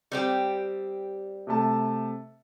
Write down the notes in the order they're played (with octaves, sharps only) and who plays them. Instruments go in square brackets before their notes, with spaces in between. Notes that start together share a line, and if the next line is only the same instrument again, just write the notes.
[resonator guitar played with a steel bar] G3 C4 G4
[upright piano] C3 A3 A5